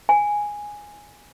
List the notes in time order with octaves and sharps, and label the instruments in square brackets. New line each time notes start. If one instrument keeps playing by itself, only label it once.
[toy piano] G#5